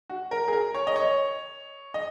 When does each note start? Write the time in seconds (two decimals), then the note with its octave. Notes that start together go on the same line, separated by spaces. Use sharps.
0.09 F#4
0.31 A#4
0.48 G#4
0.53 A#4
0.74 C#5
0.87 D#5
0.96 C#5
1.94 D#5